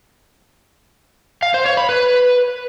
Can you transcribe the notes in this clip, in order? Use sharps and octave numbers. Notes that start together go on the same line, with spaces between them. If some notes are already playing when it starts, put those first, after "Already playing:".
F5
C5
C#5
B5
B4